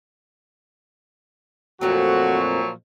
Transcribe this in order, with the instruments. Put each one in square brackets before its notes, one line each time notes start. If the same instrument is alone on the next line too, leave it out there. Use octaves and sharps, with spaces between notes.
[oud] F2 A3 C4 [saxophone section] A#2 F3 F#3 [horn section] F#4